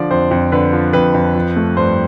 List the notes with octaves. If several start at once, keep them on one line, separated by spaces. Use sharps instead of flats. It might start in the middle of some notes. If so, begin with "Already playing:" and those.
Already playing: D3 F3 D5
F2 C5
F2
D3 B4
F3
F2 B4
F2
F3
A3
G2 C5